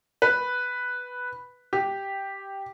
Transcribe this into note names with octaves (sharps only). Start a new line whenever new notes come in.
B4
G4